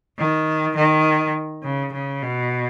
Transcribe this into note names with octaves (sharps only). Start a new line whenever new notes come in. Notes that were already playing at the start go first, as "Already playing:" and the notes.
D#3
D#3
C#3
C#3
B2